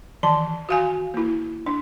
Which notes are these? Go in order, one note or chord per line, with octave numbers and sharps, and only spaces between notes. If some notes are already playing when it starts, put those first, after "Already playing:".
D#3 E3 A5
F#4 F5 G#5
A#3 E4
D4